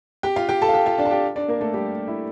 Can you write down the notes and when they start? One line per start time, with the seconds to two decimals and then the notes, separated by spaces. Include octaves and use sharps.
0.23 G4 G5
0.36 F4 F5
0.49 G4 G5
0.62 A4 A5
0.69 F5
0.74 G4 G5
0.86 F4 F5
0.98 D4 D5
1.05 A5
1.11 G4 G5
1.36 D4 D5
1.48 A#3 A#4
1.61 A3 A4
1.74 G3 G4
2.08 E4